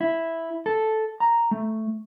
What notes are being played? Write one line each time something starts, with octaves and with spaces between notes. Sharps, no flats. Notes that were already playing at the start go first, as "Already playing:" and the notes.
E4
A4
A#5
A3